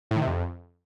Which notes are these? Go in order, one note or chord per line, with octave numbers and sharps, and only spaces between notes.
A2
D#3
C3
F2